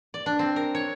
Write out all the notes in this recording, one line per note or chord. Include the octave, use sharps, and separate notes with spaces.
D5
D4
C4
A#4
C#5